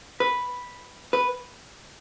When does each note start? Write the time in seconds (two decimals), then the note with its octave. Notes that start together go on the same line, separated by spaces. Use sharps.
0.20 B4
1.13 B4